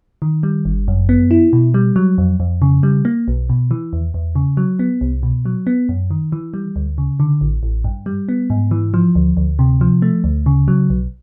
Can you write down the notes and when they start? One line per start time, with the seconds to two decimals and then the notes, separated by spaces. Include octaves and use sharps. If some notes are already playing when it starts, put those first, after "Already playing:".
0.22 D#3
0.43 G3
0.65 G1
0.88 F#2
1.09 B3
1.31 E4
1.53 B2
1.74 G3
1.96 F#3
2.18 F2
2.40 F2
2.62 C#3
2.83 G3
3.05 A#3
3.28 B1
3.49 B2
3.71 E3
3.93 E2
4.14 E2
4.35 C#3
4.57 F#3
4.79 B3
5.01 C2
5.23 B2
5.45 F#3
5.67 B3
5.89 F#2
6.11 D#3
6.32 E3
6.54 G3
6.76 D2
6.98 C#3
7.20 D3
7.41 A1
7.63 A1
7.84 G2
8.06 G3
8.29 B3
8.50 G#2
8.71 E3
8.94 F3
9.15 D2
9.37 D2
9.59 C3
9.81 F3
10.02 A3
10.24 D2
10.46 C#3
10.68 F#3
10.90 B1